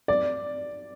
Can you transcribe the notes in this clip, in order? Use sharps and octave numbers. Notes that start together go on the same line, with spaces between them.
D5